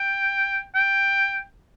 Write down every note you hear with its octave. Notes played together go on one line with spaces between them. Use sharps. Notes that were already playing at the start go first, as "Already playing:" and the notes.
Already playing: G5
G5